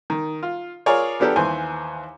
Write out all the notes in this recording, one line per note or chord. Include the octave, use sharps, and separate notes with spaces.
D#3
F4
F4 G#4 A#4 C#5 D5
F3 B3 D4 G4 A4 A#4
D#2 E3 C5 G#5